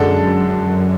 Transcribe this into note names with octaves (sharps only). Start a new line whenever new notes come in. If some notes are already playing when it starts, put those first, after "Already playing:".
Already playing: F#2 D3 G#3 D4 A4